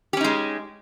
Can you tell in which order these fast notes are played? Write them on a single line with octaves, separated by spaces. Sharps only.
G4 C#4 D#4 G#3